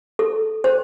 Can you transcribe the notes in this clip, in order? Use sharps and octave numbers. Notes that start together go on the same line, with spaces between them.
A4
C5